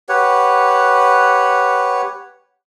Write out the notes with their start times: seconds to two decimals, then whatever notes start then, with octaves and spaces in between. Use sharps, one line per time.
0.09 G4 B4 C#5 F#5